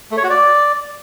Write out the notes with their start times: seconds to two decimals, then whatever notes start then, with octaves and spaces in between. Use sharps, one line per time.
0.11 A3
0.17 C#5
0.24 F#4
0.30 D5